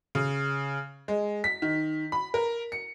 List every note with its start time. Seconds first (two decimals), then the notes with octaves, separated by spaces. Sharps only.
0.15 C#3
1.08 G#3
1.44 B6
1.62 D#3
2.12 B5
2.34 A#4
2.72 C#7